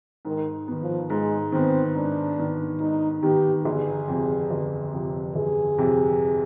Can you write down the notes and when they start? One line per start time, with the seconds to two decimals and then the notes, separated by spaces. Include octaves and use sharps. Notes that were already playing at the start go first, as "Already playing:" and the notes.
0.25 G#2 D#3
0.68 D#3 B3
0.82 F3
1.10 G#2 G#3
1.52 D#3 B3 C4
1.95 G#2 D4
2.38 D#3 B3
2.80 G#2 D#4
3.23 D#3 B3 G4
3.65 G1 G#4
4.08 F2 C3
4.51 G1
4.93 F2 C3
5.35 G1 G#4
5.78 F2 C3